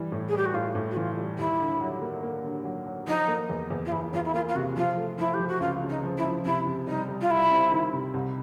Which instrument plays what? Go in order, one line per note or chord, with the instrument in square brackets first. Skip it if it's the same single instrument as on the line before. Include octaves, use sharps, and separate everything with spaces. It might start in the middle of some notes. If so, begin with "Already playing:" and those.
Already playing: [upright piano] E3 G3
A2
[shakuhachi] G#4
[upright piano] G3 [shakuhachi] G4
[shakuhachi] F#4
[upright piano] A2 [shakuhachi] F4
[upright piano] A2
[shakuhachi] F#4
[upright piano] E3 [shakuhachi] F4
[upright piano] G3
[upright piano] D#2 [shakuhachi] E4
[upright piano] D3
F#3
A#3
A#3
D3
F#3
F#3
[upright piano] F3 [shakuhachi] D#4
[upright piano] A#3
E2
E2
[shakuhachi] F4
[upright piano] E2 [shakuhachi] E4
[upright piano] E2 [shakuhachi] F4
[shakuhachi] E4
[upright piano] A#3 [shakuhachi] F4
[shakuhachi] F4
[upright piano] C3 [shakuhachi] F#4
[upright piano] F3 [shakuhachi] F4
[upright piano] A3
[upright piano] F3 [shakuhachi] E4
[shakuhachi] G4
[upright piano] F3
[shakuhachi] F#4
[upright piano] C#2 [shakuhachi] F4
[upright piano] C#3
[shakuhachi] D#4
[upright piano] F3
[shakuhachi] E4
[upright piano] F3
[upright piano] C3 [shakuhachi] E4
[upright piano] C3
[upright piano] G3 [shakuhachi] D#4
[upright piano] G3
[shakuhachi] F4
[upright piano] G3 [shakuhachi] E4
[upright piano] C4
D#3
C3
C2